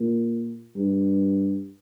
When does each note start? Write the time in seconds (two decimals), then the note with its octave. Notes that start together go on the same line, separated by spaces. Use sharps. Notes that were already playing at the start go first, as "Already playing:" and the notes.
Already playing: A#2
0.75 G2